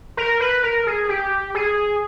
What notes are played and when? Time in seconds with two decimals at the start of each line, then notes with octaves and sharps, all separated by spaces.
0.17 A#4
0.40 B4
0.63 A#4
0.87 G#4
1.09 G4
1.55 G#4